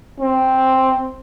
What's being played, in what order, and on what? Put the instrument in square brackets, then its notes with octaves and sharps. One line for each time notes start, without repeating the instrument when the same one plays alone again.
[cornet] C4